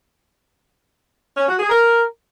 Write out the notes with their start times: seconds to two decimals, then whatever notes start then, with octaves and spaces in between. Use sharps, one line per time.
1.37 C#4
1.48 F#4
1.59 G#4
1.70 A#4